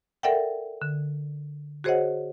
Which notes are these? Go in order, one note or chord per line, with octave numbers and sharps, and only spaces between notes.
A4 A#4 D5 E5 F#5 G5
D3
F#4 G#4 C5 C#5 D#5 F#5